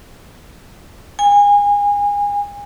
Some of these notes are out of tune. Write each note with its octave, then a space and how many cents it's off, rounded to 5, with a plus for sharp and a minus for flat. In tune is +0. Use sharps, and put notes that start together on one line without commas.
G#5 -30